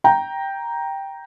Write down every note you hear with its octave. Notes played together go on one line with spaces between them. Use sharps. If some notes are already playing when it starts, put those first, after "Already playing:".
G5 A#5